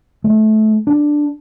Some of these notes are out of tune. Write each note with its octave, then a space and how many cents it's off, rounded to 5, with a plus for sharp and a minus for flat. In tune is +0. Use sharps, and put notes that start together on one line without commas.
A3 -25
D4 +5